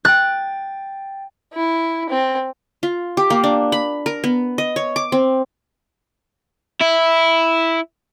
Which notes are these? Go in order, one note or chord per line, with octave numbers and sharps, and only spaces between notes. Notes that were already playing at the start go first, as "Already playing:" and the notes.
G5 F#6 A6
E4
C4
F4
G4
A#3
D4
B5
A#4
B3
D#5
C#5
D6
C4
E4